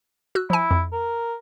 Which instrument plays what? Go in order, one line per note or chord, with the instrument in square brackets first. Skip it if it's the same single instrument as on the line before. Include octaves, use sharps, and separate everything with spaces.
[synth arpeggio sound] F#4 E6 F#6
[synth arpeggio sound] F3 G#5 [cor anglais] E4
[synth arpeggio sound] F2
[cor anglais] A#4